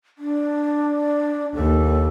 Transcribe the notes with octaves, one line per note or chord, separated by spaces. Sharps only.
D4
D#2 A4